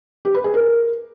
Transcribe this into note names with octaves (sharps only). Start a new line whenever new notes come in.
G4
B4
G#4
A#4